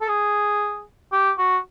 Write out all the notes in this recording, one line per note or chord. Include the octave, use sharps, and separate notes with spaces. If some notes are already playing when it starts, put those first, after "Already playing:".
A4
G#4
G4
F#4